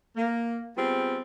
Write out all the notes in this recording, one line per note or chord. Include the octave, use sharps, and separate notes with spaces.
A#3
G3 B3 C4 F4 G#4